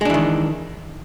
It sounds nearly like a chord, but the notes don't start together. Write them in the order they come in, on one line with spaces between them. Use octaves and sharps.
G#3 D4 E3 D#3